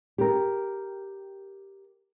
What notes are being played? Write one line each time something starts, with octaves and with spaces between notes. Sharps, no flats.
G4 A#4